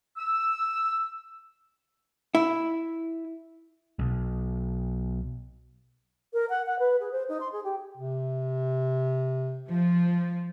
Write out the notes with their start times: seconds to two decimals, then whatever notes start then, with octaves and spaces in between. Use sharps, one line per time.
0.17 E6
2.35 E4
3.99 B1
6.33 A#4
6.49 F#5
6.66 F#5
6.79 B4
7.00 G#4
7.11 C5
7.28 D#4
7.40 C6
7.52 G#4
7.63 G4
7.97 C3
9.70 F3